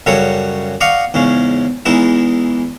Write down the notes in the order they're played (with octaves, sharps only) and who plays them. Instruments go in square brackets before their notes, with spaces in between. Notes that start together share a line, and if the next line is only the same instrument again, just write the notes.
[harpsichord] F#2 C#3 G3 F#4 A4 C#5
D5 D#5 F5 F#5 C#6
E2 G#2 C#3 C#4
E2 E3 G#3 D#4 E5